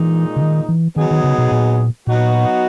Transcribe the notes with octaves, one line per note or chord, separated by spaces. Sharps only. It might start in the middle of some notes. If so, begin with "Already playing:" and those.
Already playing: A#2 E3 G#3 D#4
C#3
D#3
E3
D#3 F#3 B3 D#4 G#4
D#3
C#3
B2
A#2
A#2 F#3 B3 D#4 F#4